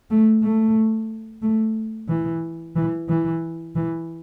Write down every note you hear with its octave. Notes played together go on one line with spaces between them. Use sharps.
A3
A3
A3
E3
E3
E3
E3